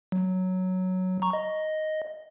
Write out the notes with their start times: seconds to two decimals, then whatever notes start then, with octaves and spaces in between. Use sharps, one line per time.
0.12 F#3
1.22 A#5 C#6
1.33 D#5